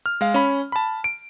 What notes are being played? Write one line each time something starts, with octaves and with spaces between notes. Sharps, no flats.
F6
G#3 F5
C#4 B5
A5 B5
D7